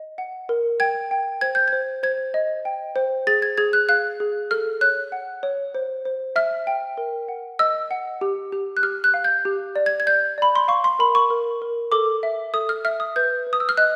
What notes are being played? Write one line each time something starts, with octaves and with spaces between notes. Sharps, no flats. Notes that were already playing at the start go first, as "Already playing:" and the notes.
Already playing: D#5
F#5
A#4
G5 G#6
G5
C5 G#6
G6
C5 G#6
C5 G#6
D#5
G5
C5
G#4 A6
G#6
G#4 G#6
F#6
F5 F#6
G#4
A4 F6
C#5 F#6
F#5
C#5
C5
C5
E5 F6
G5
A#4
F#5
D#5 E6
F#5
G4
G4
F#6
G4 F6
F#6
F5
G6
G4
D5
G#6
G#6
D5 G6
D5 B5
C6
F5 C#6
C6
A#4 B5
C#6
A#4
A#4
A4 D6
E5
A4 D#6
F6
E5 F6
D#6
B4 G6
B4
D#6
E6
F6
D#5 F#6